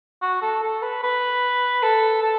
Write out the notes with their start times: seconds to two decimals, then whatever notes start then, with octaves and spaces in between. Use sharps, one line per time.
0.22 F#4
0.42 A4
0.62 A4
0.82 B4
1.03 B4
1.83 A4
2.23 A4